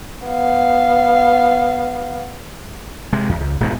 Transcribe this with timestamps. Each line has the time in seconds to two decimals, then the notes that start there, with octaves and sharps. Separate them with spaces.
0.27 B3 F5
3.13 C3 G#3
3.29 E2
3.41 C#2
3.60 D#1 G#2 B2 D#3